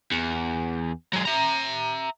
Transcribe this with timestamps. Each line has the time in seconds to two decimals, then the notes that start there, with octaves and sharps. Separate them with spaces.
0.12 E2
1.13 F#3 G#3
1.25 E5 A#5